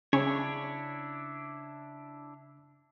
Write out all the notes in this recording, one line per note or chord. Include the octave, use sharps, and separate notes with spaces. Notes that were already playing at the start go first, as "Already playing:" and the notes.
C#3 C#4 D4 E4 C#5